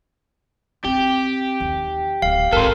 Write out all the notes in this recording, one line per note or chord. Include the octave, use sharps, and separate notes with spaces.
C4 G4
D#2
D1 F5
G#1 D#3 A4 A#4 C5